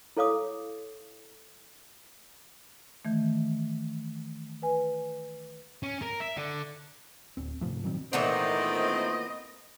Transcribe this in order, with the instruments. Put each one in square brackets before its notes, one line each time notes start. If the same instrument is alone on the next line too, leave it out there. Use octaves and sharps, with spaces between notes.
[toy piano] E4 A4 C#5 F5 D6 D#6
[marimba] D#3 E3 A3
B4 G#5
[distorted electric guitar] C#4
A#4
E5
D3
[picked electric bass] D1 C4
G#2 C3 F3 A3
A#2 D#3 F#3 C4
[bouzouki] A#2 E3 B3 [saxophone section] D#3 A3 C4 [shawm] D#5